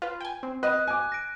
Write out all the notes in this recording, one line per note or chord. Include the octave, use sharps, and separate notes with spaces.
F4 B4
G5 G#5
C4
B4 D#5 F#6
G#5 D6
A#6 D7